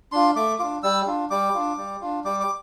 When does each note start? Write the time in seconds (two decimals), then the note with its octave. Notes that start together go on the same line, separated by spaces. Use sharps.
0.12 D4 F4 C6
0.36 A3 D6
0.59 D4 F4 D6
0.83 G3 E6
1.07 D4 F4
1.30 G3 D6
1.54 D4 F4
1.77 G3
2.01 D4 F4
2.24 G3 D6
2.40 D6